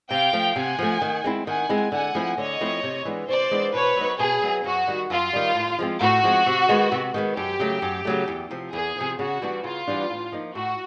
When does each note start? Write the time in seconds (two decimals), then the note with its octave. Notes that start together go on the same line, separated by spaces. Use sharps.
0.11 C3 F5 G5
0.33 F3 A3
0.56 C3 F#5 G#5
0.79 F3 A3
1.02 D#3
1.24 G#3 C4 E4
1.46 D#3 F#5 G#5
1.69 G#3 C4 E4
1.92 D3 F#5 G#5
2.15 F3 A3 C4 E4
2.37 D3 C#5 D#5
2.61 F3 A3 C4 E4
2.83 C3
3.05 E3 G#3 B3 D4
3.28 C3 C5 D5
3.51 E3 G#3 B3 D4
3.74 B2 B4 C#5
3.96 F#3 B3 D#4
4.19 B2 G#4
4.42 F#3 B3 D#4
4.64 F#2 F#4
4.87 D#3 G3
5.10 F#2 F4
5.33 D#3 G3
5.55 A2
5.79 F3 G#3 C4
6.00 A2 F#4
6.24 F3 G#3 C4
6.46 C3
6.68 D#3 G#3 B3
6.92 C3
7.14 D#3 G#3 B3
7.37 F#2 G4
7.60 C#3 F#3 A3
7.82 F#2
8.05 C#3 F#3 A3
8.28 E2
8.51 C3 F3
8.73 E2 G#4
8.96 C3 F3
9.19 C#3 F#4
9.42 E3 G3 B3 D4
9.64 C#3 F4
9.87 E3 G3 B3 D4
10.10 A2
10.32 F3 A#3 D#4
10.54 A2 F#4